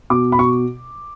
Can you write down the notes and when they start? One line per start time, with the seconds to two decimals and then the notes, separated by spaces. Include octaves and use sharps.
0.10 B2 D6
0.32 B5
0.39 B2 C#6